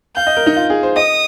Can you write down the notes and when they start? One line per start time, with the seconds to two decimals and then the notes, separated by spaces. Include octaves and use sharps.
0.16 F5 G6
0.27 D#5
0.37 A#4
0.46 D#4
0.56 F4
0.70 G#4
0.83 C5
0.96 D#5 D#6